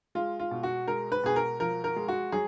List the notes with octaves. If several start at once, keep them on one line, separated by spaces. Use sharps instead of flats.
G#3 F4
F4
B2
F#4
G#3 A#4
B4
B2 G#4
A#4
F3 A#4
A#4
G#3
F#4
F#3 G#4